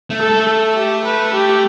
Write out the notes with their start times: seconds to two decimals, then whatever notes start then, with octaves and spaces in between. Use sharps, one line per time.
0.10 A3
0.20 A4
0.30 A3
0.49 A4
0.77 G4
1.05 B4
1.34 G4